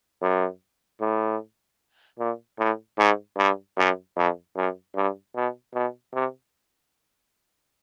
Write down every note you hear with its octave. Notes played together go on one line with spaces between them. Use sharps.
F#2
A2
A#2
A2
G#2
G2
F#2
F2
F#2
G2
B2
B2
C3